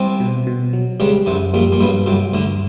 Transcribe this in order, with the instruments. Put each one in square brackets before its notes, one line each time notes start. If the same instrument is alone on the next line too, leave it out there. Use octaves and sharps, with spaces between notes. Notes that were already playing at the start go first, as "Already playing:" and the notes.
Already playing: [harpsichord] C2 C3 [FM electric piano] C4
[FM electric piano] B2
B2
F#3
[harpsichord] C#2 C#3 [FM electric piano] G3
[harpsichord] C2 C3 [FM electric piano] F#2
[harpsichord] A#1 A#2 [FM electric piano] G3
[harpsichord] A#2
[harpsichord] B1 B2 [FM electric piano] G2
[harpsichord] C2 C3 [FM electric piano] F#3
[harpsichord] D2 D3 [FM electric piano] G2